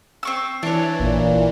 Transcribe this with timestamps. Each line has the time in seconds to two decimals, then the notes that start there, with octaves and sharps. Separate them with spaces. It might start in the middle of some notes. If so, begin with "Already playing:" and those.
0.23 C4 C#6 E6
0.63 E3 D4 C#5
1.00 A1 A#2